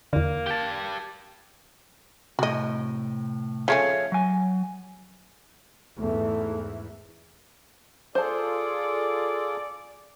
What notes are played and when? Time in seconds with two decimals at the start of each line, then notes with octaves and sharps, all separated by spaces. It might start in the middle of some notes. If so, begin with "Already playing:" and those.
0.13 E2 D3 A#3
0.47 G4 A5
2.39 A2 C3 F#4 D#5
3.68 F3 A3 C#4 G#4 C#5 F5
4.12 F#3 G#5
5.97 E2 G#2 E3 A3
8.15 F4 G#4 A4 C5 D5 A5